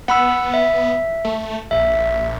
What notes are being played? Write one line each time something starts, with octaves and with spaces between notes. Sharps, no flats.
B3 F#5 B5 E6
E5
A3
A#1 E5